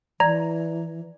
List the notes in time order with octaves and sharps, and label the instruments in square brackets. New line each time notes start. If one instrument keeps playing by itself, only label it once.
[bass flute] E3 [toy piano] D5 [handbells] A#5